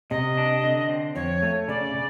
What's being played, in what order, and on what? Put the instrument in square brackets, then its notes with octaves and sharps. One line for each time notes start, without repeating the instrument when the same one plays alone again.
[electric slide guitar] C3 [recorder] D#5
[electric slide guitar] D4
D3
C4
[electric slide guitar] F2 [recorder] C#5
[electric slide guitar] A3
[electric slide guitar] C#3 [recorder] D5
[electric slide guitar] C#3